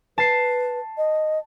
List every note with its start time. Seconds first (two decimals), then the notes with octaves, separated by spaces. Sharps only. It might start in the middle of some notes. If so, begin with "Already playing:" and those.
0.18 B4 A5 C7
0.98 D#5